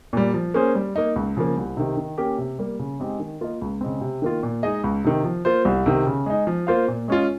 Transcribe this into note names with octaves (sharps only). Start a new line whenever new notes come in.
A#2 G3
F3
A#3 C#4 G#4 C5
G3
A#3 D#4
C#2
C#3 F3 A#3
C2
C3 D#3
D#3
A#3 C#4 G4 A#4
C3
G3 A#3
C#3
G#3 C4 D#4 G4
D#3
A#3 F4 A#4 D#5
C#2
C#3 G#3 C4
C3
D#3 A#3 F4
A#2
G#3 D#4 G#4 D#5
C#2
C3 D#3
F3
A#3 F4 C5
C2
C3 D#3
C#3
G#3 D#4
F3
A#3 F4 C5 F5
A#2
G#3 C#4 F4